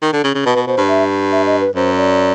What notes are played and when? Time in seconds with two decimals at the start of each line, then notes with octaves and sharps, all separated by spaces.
0.02 D#3
0.13 D3
0.24 C#3
0.35 C#3
0.45 B2 B4
0.56 B2
0.67 B2 C5
0.78 G2
0.88 E5
1.32 E5
1.46 D#5
1.61 B4
1.75 F#2 C5
1.97 D5